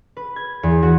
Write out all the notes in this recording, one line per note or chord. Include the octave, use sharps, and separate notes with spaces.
B4
G#6
E2
F#4